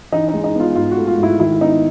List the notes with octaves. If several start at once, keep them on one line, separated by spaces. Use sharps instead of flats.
E3 D#4
G#3 D#4
D#4
B3 F4
G#2 F4
F#4
A3
F4
G#2
E4
D#3 E4
B3 D#4